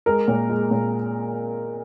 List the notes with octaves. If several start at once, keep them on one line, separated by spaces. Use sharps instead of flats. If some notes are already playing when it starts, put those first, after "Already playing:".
G#3 A#4
A#2
G#3
A#2